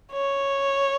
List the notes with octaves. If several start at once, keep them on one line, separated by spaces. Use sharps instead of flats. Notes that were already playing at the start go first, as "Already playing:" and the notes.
C#5